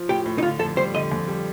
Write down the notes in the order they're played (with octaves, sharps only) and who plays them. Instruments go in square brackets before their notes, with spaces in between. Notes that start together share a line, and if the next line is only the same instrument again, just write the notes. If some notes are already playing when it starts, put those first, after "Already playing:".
Already playing: [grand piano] F3 F4
[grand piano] A2 [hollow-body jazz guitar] G4
[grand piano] A2
[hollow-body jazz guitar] D#4
[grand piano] D3 [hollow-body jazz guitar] F4
[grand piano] F2 [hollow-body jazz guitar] A4
[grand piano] G3 [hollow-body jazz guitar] C5
[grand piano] D3 [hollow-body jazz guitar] D#5
[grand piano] F2
G3